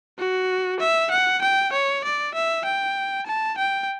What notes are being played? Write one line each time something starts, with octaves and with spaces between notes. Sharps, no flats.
F#4
E5
F#5
G5
C#5
D5
E5
G5
A5
G5